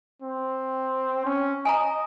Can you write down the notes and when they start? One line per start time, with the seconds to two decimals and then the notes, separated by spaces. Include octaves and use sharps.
0.22 C4
1.26 C#4
1.65 D#5 G#5 A#5